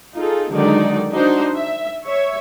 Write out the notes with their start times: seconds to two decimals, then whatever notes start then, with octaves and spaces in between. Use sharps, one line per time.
0.15 D#4 F4 G#4 A4
0.50 D3 D#3 F#3 G#3 D#4 D5
1.13 D4 D#4 F#4 C5
1.54 E5
2.06 C#5 E5